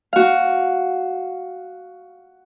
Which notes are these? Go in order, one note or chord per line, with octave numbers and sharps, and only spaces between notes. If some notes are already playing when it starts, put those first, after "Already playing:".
F#4 F5